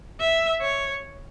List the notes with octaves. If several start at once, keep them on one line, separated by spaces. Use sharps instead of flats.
E5
C#5